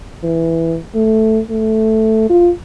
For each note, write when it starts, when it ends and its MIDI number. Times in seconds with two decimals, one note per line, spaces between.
0.24 0.77 52
0.95 1.40 57
1.50 2.26 57
2.29 2.50 65